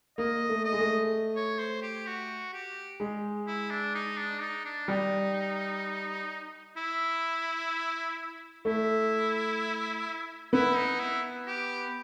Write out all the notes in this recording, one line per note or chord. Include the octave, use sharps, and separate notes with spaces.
A#3 D#5
A3
D#5
G#3
A3
C#5
C5
G4
F#4
G4
G#3
E4
D4
D#4
D4
D#4
D4
G3 D#4
E4
A3 E4
B3 E4
D#4
E4
G4